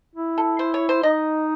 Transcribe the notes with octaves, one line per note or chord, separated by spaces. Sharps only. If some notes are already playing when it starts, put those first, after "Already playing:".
E4
A4
C5
C#5
C5
D#4 D#5